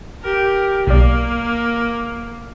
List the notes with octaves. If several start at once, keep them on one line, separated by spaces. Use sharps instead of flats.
G4 A#4
B1 A#3 D5